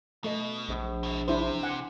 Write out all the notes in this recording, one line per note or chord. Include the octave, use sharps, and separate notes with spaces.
B2 A3 A4 D#5
A#1
B2 E4
C3 D4 E4 C5
F#5 G#5